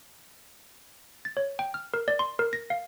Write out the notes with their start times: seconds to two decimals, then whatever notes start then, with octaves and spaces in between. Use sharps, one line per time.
1.25 A6
1.37 C#5
1.59 G5
1.74 F6
1.94 A#4
2.08 D5
2.19 C6
2.39 A#4
2.53 A#6
2.70 F5